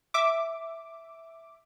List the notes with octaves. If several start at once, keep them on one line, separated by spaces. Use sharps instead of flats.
E5 D6